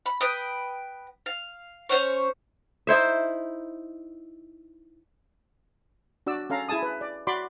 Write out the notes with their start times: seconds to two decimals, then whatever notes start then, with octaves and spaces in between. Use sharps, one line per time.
0.06 B5
0.21 B4 G5 D#6
1.26 F5
1.89 C#4 F4 C5 C#5
2.87 D#4 E4 C5 E5
6.27 D4 F#4 D5 E6
6.50 C#4 A4 F5 A#5
6.69 E4 G#4 G#5 A5 D#6
6.82 B4
7.01 D5
7.27 F#4 D5 B5 C6 D6